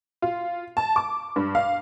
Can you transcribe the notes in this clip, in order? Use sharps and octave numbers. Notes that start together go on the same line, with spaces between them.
F4
A5
D6
G2
F5